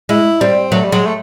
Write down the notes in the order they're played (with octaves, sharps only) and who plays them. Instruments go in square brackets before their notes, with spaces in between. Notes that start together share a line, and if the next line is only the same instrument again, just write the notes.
[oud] G#3 [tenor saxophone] E4
[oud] G3 [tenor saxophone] C4
[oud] F#3 [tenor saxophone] A3
[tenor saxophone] G3
[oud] F#3 [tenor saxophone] G#3
[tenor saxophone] A3